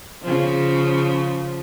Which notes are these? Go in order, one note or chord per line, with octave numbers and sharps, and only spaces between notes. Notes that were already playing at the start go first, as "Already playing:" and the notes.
C#3 F3